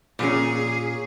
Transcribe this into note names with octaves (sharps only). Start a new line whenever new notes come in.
A#2 C#4 G#4